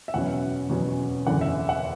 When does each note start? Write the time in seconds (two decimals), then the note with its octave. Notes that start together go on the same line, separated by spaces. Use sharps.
0.08 E5
0.14 E2 B2 F#3 C#4 F#5
0.70 E2 B2 F#3 C#4
1.26 F#1 E2 D3 F#5
1.41 E5
1.69 F#5